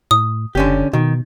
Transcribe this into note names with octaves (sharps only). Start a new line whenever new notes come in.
A2 D#6
F#1 D3 C#4 G4
B2 D#3